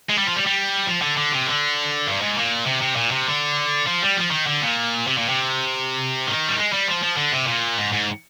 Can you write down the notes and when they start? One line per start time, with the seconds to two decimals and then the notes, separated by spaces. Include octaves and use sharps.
0.10 G#3
0.18 G3
0.27 F3
0.36 G3
0.47 G3
0.87 F3
1.02 D3
1.17 D3
1.32 C3
1.47 D3
2.07 G2
2.21 G#2
2.36 A#2
2.67 C3
2.82 C3
2.97 A#2
3.12 C3
3.27 D3
3.87 F3
4.03 G3
4.17 F3
4.32 D#3
4.47 D3
4.62 A#2
5.07 C3
5.18 A#2
5.29 C3
6.27 D#3
6.48 G3
6.58 G#3
6.73 G3
6.87 F3
7.03 F3
7.17 D3
7.33 C3
7.48 A#2
7.78 G#2
7.93 G#2